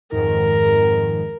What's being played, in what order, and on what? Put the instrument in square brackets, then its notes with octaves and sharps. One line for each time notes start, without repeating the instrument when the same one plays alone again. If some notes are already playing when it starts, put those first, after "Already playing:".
[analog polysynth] F2 G#2 D#3 [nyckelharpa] A#4